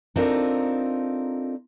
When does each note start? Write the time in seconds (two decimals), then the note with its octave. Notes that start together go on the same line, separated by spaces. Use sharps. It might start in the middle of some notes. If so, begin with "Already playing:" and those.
0.16 C4 D4 D#4 F4 A4 A#4